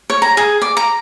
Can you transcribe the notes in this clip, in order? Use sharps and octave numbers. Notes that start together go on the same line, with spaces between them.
C#5
A#5
G#4
D5
A#5